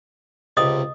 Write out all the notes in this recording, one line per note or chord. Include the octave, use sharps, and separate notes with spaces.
C#2 C3 D#5 D#6